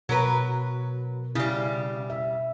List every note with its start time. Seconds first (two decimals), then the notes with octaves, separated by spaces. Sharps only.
0.09 B2 F#3 A#4 B4
1.35 C#3 G3 E4
2.10 E5